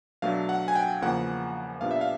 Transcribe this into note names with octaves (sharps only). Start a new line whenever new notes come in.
B2 F#3 A3 D4 F5
F#5
G#5
G5
E2 C#3 F3 A#3 F#5
A#2 G3 B3 D4 F5
E5
F5